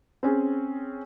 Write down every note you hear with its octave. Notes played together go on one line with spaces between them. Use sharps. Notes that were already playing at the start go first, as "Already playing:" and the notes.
C4 C#4 G#4